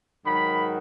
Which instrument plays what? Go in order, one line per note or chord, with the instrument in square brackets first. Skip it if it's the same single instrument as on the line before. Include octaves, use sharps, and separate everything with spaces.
[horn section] G#2 D#3 F#3 B5